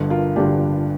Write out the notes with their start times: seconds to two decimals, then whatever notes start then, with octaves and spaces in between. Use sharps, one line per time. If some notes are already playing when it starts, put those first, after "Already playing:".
Already playing: G1 G2 D3
0.10 F4 A#4
0.36 G1 G2 D3 D4 G4